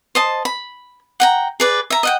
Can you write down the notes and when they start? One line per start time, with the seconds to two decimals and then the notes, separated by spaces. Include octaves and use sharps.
0.15 C5 D#5 A5
0.45 B5
1.20 F#5 G5 A#5
1.60 G#4 B4 D5
1.90 E5 A#5
2.03 D#5 F#5 G5